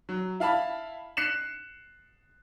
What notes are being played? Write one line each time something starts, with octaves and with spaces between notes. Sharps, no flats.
F#3
E4 F5 A5 B5
F#6 C7 C#7 E7